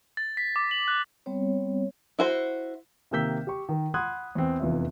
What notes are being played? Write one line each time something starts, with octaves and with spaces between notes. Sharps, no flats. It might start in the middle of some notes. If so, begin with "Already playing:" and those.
A6
B6
D6
F#7
F#6
G3 B3 C4 C#5
E4 F#4 C5
C3 D#3 A#3 E6 G6 B6
G4 C#6
D#3
F#5 B5 C6 D#6 F#6 G#6
E2 C4
F1 E2 F4 E5